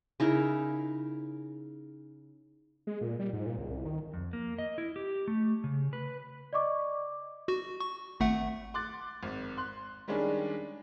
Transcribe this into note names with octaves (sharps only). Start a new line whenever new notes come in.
C#3 D#4 E4 A#4
G#3
A#2
G3
G#2
A#2
C#2
C2
D#3
F2
A#3
D#5
E4
G4
A3
C#3
B4
D5 D#5 C#6 D6
F#4
C#6
G#1 A3 F#5
C6 D6 F#6 A6
G#1
C6 F#6
D#3 G3 G#3 C#4 D4